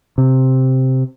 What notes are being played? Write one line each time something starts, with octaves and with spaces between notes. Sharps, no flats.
C3